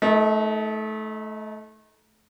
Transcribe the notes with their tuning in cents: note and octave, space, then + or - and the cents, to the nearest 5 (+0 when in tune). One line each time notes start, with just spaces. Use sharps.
A3 -20 D#4 +30 A#4 +10